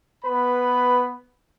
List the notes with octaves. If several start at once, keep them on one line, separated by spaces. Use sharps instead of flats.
B3 B4 B5